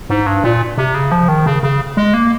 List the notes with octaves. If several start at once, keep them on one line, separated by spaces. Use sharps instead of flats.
G#2
G2
A#2
C3
C#3
F3
D#3
C#3
C#3
G#3
A#3